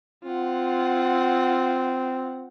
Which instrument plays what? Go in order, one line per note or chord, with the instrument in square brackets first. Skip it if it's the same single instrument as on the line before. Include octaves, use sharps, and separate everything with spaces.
[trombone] C4 [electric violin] F4 F#5